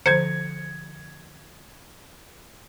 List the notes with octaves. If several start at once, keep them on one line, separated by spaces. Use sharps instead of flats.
D3 F3 C5 G#6 C#7